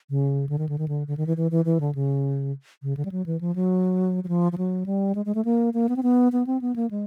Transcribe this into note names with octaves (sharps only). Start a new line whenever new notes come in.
C#3
D3
D#3
D3
D#3
D3
D3
D#3
E3
E3
E3
E3
D3
C#3
C#3
D3
G3
F#3
E3
F3
F#3
F#3
F3
F3
F#3
G3
G#3
G#3
A3
A#3
A#3
B3
C4
B3
B3
C4
B3
A#3
G#3